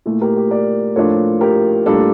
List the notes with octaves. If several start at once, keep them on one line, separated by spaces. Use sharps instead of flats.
A#2 A3 E4
G4 A#4
G4
A#4 D5
A2 F3 A#3 D4 F4 A4 C#5
G4 A#4
A2 G3 A#3 D4 F4 A4